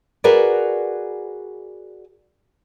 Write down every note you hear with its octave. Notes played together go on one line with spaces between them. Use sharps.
F#4 G#4 A#4 B4 D5